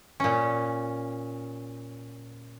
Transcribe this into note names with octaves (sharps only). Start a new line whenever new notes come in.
A#2 C#4